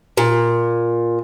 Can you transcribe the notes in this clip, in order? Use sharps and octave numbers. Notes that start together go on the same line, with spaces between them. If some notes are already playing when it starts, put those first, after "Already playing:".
A#2